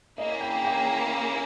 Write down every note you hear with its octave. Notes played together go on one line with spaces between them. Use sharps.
A#3 C#4 E4 G#4 D#5
G5
G5